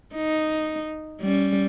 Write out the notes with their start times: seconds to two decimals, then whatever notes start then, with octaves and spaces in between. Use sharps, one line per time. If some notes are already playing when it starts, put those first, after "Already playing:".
0.15 D#4
1.21 G3 C#4